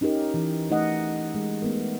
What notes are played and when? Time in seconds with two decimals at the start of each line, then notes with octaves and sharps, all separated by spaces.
0.01 C#4 D#4 G4 A#4
0.34 E3
0.70 A3 D#4 D#5 F#5
1.35 G#3
1.62 A3 B3 A#4